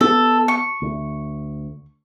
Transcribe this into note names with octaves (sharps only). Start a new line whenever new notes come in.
B3 A4
C#6
D2